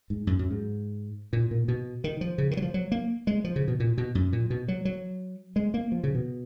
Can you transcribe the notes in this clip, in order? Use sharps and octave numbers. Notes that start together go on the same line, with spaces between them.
G#2
F#2
F#2
G#2
A#2
A#2
B2
D#3
F3
C#3
D#3
F#3
F3
F#3
A#3
G#3
F3
C#3
B2
A#2
B2
F#2
A#2
B2
F#3
F#3
G#3
A#3
F3
C#3
B2